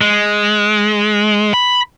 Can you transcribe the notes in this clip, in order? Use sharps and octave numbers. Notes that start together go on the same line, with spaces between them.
G#3
B5